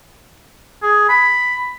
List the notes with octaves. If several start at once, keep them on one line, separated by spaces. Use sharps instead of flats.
G#4
B5